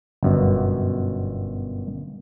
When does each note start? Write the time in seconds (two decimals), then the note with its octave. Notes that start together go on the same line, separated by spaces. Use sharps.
0.23 G1 F#2 B2